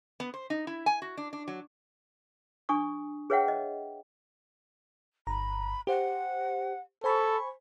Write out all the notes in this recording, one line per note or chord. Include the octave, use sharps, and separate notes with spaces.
B3
C5
D#4
E4
G#5
F#4
D4
D4
F#3
D4 G#5 C#6 D#6
G#4 B4 C#5 E5 F#5 G5
D#5
G1 A#5 B5
G4 C5 F#5
A4 C5 G#5 B5 C#6